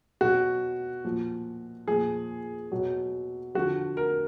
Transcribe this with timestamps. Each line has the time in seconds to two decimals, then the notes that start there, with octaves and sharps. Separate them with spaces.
0.21 B2 F#3 F#4
1.04 A#2 F3
1.88 A#2 F3 G#4
2.72 B2 F#3
3.55 D3 F3 F#4
3.97 A#4